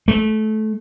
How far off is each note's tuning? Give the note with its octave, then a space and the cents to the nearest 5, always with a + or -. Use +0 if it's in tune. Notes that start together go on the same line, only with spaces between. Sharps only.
A3 -20